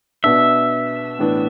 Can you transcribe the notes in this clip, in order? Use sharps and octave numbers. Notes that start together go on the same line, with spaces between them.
B2 B3 D4 E5
A2 E3 B3 D4